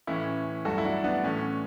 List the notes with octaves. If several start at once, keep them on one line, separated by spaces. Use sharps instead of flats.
A2 E3 A3 C#4 E4
G2 F#3 A3 F#4 A4
E4
D4 F#4
B3 D4
A2 E3 A3 C#4